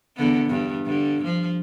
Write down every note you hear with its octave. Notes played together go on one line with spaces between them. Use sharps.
E2 D3 B3
E2 G2
G2 D3
F3